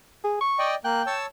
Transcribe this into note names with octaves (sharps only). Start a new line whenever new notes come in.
G#4
C#6
D5 D#5 G5
A#3 G5 F#6
C#5 A5 E6